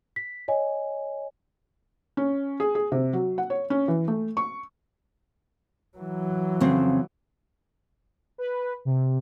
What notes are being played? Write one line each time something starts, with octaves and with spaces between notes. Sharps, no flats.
B6
C#5 D#5 G#5
C#4
G#4
G#4
C3
F#3
F#5
C#5
C#4
E3
A3
C#6
E3 F#3
F2 C#3 C4
B4
C3